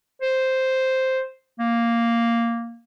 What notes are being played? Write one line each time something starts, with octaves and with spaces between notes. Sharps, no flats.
C5
A#3